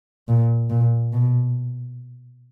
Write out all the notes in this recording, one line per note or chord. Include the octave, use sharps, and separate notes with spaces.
A#2
A#2
B2